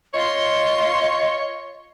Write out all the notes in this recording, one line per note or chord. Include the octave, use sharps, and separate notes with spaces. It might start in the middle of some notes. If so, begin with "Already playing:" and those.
F4 C#5 D#5 C6